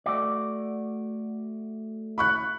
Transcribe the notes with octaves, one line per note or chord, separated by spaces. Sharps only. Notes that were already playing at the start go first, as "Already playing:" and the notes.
A3 F#4 D5
B5 C#6 F#6